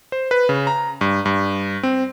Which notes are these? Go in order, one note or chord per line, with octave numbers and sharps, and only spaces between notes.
C5
B4
C#3
A#5
G2
G2
C4